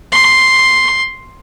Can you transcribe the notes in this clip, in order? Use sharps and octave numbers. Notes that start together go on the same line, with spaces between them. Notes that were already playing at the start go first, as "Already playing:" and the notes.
C6